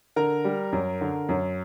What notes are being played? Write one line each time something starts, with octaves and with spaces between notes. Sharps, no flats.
D3 A#4 A#5
G3
F#2
D3
F#2